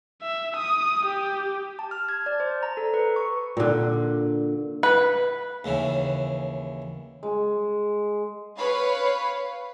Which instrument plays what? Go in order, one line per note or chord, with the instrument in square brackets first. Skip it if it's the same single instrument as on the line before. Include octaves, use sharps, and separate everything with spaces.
[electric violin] E5
D#6
G4
[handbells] A5
F6
G#6
D5
C5
A#5
A4
B4
C#6
[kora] A#2 D3
[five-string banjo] B4
[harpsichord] D#2 C#3 E3
[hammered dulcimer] G#3
[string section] B4 C#5 F5 B5